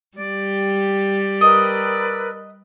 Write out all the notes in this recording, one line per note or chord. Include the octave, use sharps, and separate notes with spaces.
G3 G4 D5
A#4 B4 D#5 E6